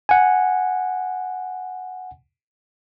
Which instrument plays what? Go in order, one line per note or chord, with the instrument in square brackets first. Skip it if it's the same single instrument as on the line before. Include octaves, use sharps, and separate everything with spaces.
[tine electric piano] F#5 G#5